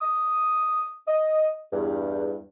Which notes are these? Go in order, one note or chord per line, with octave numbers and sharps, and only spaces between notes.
D#6
D#5
E2 G2